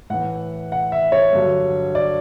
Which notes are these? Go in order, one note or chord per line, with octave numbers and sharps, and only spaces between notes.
A2 E3 F#5
F#5
E5
C#5
G2 D3 F#3
D5